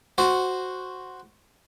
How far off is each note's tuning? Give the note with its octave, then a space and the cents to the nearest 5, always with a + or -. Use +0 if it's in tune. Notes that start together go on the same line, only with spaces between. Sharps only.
F#4 +0 C5 +0